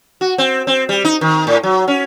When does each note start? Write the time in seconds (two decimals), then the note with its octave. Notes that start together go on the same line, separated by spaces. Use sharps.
0.21 F#4
0.38 C4
0.67 C4
0.89 G3
1.05 D#4
1.21 D#3
1.47 A2
1.63 F#3
1.88 C#4